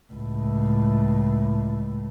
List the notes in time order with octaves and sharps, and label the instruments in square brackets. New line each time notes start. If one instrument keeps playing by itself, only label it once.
[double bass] C#2 A2